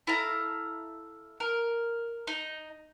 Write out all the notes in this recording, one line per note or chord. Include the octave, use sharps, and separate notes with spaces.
E4 A4 F5 A#5
A#4
D#4